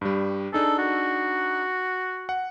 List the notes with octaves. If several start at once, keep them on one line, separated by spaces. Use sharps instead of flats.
G2 G3
D4 D#4 G#4 A4
F#4
F#5